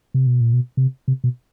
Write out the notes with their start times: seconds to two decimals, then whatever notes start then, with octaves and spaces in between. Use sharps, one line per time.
0.14 C3
0.27 B2
0.41 A#2
0.53 B2
0.77 C3
1.08 C3
1.24 B2